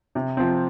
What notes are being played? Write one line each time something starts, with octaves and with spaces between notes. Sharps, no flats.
C3
F3 C4